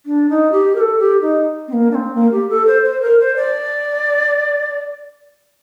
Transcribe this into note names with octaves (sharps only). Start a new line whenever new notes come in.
D4
D#4
G4
A#4
A4
G4
D#4
C4
A#3
D4
C4
A#3
G4
A4
C5
C5
A#4
C5
D5